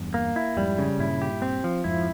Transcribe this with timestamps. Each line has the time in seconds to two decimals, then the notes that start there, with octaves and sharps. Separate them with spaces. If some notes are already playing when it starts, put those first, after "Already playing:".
Already playing: E2 G2
0.14 A#3
0.36 E4
0.57 F2 G#2 G3
0.78 C#3
0.99 G2 A#2 E4
1.22 G4
1.42 C4
1.64 F3
1.84 F2 G#2 E4